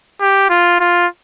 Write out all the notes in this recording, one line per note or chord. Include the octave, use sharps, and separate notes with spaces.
G4
F4
F4